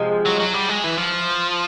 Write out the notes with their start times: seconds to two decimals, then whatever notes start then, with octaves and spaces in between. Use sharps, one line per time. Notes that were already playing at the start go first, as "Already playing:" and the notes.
Already playing: C3 F3 G#3
0.26 F#3
0.40 F#3
0.54 G3
0.69 G#3
0.84 E3
0.98 F3